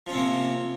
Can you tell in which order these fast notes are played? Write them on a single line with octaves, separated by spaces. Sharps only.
F3 C#4 C4 C3 A#3